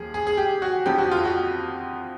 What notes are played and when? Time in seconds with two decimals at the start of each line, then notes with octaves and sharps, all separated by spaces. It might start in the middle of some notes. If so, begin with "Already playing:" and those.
Already playing: D#2 F3 G#4
0.14 G#4
0.27 G#4
0.37 G4
0.62 F#4
0.86 F2 D3 F3 G4
0.99 F#4
1.11 F4
1.25 F#4